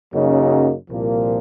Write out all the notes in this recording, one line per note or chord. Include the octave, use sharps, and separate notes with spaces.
F#2 C#3 F#3 A#3 D#4
C2 A#2 F3 A#3